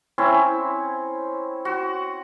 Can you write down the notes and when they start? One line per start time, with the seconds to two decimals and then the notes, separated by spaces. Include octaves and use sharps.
0.18 C4 C#4 E4
1.65 F#4